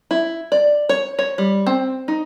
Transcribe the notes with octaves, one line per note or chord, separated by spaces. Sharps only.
E4
D5
C#5
C#5
G3
C4
D#4